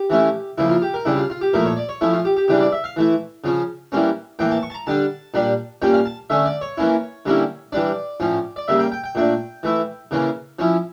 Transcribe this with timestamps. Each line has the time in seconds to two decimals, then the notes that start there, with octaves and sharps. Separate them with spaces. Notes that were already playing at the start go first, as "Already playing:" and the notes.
Already playing: G4
0.10 E3 A3 C#4 E4
0.58 C#3 F3 A#3 E4
0.69 F4
0.82 G4
0.94 A#4
1.05 C#3 G3 D4 E4
1.17 F4
1.30 F4
1.41 G4
1.54 A#2 F3 A3 E4 A#4
1.66 C#5
1.76 D5
1.89 C#5
2.01 F3 A3 C#4 E4
2.13 F4
2.25 G4
2.36 G4
2.48 C#3 E3 G3 D4 G4
2.61 D5
2.72 E5
2.84 F5
2.96 E3 A3 E4
3.44 C#3 F3 C#4
3.92 E3 G3 A#3 C#4
4.39 A2 E3 A#3 G5
4.51 A5
4.63 C#6
4.70 A5
4.74 A#5
4.87 D3 G3 D4 A5
5.34 A#2 G3 D4
5.82 A#2 G3 C#4 G5
5.94 F5
6.05 A5
6.30 D3 A3 C#4 E5
6.46 D5
6.61 C#5
6.77 E3 A#3 C#4 E4
7.26 D3 G3 A#3 C#4 E4
7.72 E3 G3 D4 D5
8.20 A2 F3 C#4
8.56 D5
8.68 C#3 G3 A#3 E5
8.79 G5
8.92 G5
9.04 G5
9.15 A#2 A3 D4
9.63 E3 A3 E4
10.11 C#3 E3 A#3 C#4
10.59 F3 C#4 E4